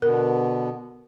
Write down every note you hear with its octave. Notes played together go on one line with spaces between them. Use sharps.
B2 D3 B3 A#4